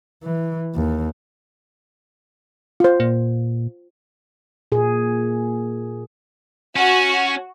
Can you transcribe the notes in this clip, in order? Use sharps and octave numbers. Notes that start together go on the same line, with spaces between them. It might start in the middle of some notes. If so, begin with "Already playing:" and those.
E3
D#2
F4 C5
A#2
A#2 G#4
C#4 F#4